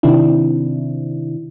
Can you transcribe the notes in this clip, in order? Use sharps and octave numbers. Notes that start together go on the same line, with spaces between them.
C3 D#3 C4 D4 E4